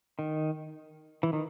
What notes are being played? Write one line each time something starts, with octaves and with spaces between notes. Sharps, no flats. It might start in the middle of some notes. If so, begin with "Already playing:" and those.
D#3
E3
D#3